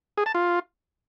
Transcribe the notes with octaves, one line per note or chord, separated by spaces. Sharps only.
G#4
A5
F4